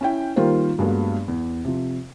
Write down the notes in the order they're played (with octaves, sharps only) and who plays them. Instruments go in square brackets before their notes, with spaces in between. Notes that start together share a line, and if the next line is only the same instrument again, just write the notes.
[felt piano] C#4 E4 G5
D#3 G3 A#3 F4 C5
G2 F#3 G#3 A#3 B3
E2
C3 F3